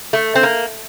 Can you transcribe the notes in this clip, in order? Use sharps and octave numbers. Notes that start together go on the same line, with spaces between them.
A3
C4
A#3